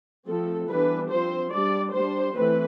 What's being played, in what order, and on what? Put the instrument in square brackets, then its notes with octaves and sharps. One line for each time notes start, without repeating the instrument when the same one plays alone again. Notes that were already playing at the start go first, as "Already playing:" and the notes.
[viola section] F3 A3 C4 A4
E3 G3 B3 D4 B4
F3 C4 C5
G3 D4 D5
G3 D4 C5
E3 A3 C4 B4